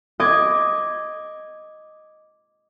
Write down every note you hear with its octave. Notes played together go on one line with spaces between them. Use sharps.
D#5 D6 G#6